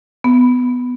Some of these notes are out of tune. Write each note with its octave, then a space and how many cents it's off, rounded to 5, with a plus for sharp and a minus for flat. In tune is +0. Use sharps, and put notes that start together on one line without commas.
B3 +10